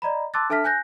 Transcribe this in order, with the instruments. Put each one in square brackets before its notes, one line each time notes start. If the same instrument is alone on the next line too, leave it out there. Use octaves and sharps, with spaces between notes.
[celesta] D5 D#5 A#5 B5
A5 C6 D6 E6 F#6 A6
D4 A4 E5 A5 F6 B6
G#5 F#6 G6 A#6